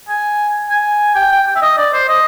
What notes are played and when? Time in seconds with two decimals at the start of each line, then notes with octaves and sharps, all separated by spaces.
0.09 G#5
0.70 G#5
1.15 G5
1.32 G5
1.47 G5
1.56 E5
1.62 D#5
1.78 D5
1.93 C5
2.09 D#5